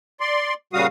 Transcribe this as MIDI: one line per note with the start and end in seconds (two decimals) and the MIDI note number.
0.20 0.54 74
0.20 0.54 84
0.73 0.87 46
0.73 0.87 49
0.73 0.87 55
0.73 0.87 66
0.73 0.87 77
0.73 0.87 87